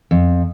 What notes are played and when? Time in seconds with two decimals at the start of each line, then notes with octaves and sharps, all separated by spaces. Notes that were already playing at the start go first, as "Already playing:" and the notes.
0.11 F2